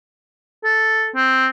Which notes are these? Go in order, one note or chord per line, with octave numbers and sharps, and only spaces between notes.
A4
C4